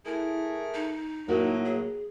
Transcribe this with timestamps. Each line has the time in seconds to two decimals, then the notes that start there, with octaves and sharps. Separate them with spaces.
0.05 A3 E4 G#4 A#4
0.74 D#4
1.28 A2 F#3 A#3 F#4 A#4
1.65 G#4